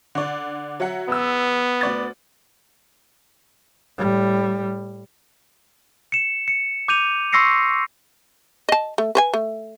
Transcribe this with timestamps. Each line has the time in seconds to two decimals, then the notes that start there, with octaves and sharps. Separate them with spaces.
0.15 D3 D5
0.80 F#3 E5 F#5
1.08 E2 B3 E6
1.81 D2 D5 A6
3.98 A2 G3
6.12 C#7 E7
6.48 C#7
6.88 D6 G6 D#7 F7
7.32 C6 C#6 E6 A#6 C7 C#7
8.69 D#5 A5
8.98 A3
9.15 B4 C5 G#5
9.34 A3